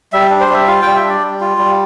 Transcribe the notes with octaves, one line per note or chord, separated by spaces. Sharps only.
G3 E5
D4
C5
G3 E5
F4 F5
G3 G5
E5
D4 D5
G3
F4
G3